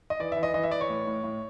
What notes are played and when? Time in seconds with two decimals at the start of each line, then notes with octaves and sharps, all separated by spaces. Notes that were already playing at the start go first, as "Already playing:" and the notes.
0.10 D#5
0.20 E3 D5
0.32 E3 E5
0.43 D#5
0.54 E3 D#5
0.64 E5
0.71 E3 D5
0.81 C#5
0.89 A2
1.07 A2
1.24 A2